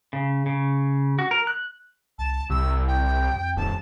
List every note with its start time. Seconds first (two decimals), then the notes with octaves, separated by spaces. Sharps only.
0.13 C#3
0.46 C#3
1.19 F#4
1.31 A#4
1.47 F#6
2.18 C2 A5
2.50 C2 C3 E6
2.87 G5
3.34 F2
3.57 D#1 A5